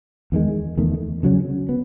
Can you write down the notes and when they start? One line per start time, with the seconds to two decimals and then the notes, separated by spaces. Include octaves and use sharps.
0.32 E2 D#3 G#3
0.77 E2 D#3 A3
1.23 C#3 F#3 C#4
1.69 B3